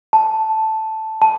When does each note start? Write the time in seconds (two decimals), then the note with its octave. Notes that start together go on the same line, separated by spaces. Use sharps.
0.13 A5
1.22 A5